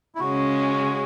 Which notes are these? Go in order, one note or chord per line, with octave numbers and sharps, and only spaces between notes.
E4
C#3 G#3 C#4 F#4